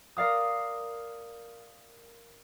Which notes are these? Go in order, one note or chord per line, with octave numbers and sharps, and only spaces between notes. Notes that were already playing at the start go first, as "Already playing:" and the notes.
A#4 D5 F5 D#6